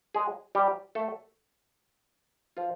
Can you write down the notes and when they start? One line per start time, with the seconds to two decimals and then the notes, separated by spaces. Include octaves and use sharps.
0.14 G#3 G#4
0.55 G3 G4
0.95 A3 A4
2.57 F3 F4